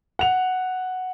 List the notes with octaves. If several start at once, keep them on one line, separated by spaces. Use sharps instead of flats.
F#5 F7